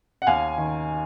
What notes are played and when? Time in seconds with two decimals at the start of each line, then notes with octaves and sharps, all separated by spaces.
0.22 F#5
0.27 D#2 F5 G#5
0.58 D#3